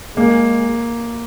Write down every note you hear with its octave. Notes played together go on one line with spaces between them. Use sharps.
G#3 A#3